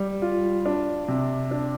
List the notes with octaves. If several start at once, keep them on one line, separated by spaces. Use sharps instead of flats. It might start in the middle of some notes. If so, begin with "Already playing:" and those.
Already playing: G3
F4
D4
C3
D4